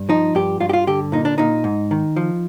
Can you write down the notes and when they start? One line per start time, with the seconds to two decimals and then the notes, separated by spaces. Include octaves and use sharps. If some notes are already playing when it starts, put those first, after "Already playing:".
Already playing: G2
0.09 F3 D#4
0.35 G2 G4
0.60 G2 F4
0.69 G4
0.73 F4
0.87 D3 G4
1.12 A#2 D#4
1.25 D4
1.38 A#2 D#4
1.64 G#2
1.91 D#3
2.16 F3